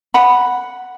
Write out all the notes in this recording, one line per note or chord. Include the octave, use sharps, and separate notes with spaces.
F#5 B5